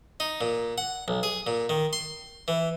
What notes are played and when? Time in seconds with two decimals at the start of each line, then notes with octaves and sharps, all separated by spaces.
0.20 D#4
0.41 A#2
0.78 F#5
1.08 B1
1.23 G#4
1.47 A#2
1.69 D#3
1.93 C6
2.48 E3